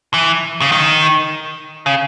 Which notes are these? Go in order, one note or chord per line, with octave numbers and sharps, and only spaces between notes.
E3
C#3
D#3
C#3